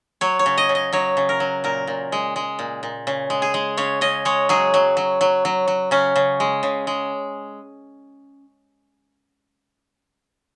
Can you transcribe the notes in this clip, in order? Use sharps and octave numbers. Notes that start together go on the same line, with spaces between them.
F#3 C#5
C#5
C#3
D#5
C#3
D#5
F#3 C#5
C#3
A#4
F#3
A#2 A#4
A#2
G#3
G#3
A#2
A#2
C#3
G#3
G#4
G#3
C#3 C#5
C#3 D#5
G#3 C#5
F#3 G#4
F#3
F#3
F#3
F#3
F#3
C#3 C#4
C#3
G#3
C#3
G#3